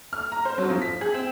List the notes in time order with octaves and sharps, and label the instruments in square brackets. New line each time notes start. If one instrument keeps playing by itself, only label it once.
[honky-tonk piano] F6
A#5
C5
F#3
F3
B6
G#4
C4